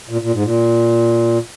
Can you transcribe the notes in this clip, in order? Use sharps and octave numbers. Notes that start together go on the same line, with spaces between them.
A#2
A#2
G#2
A#2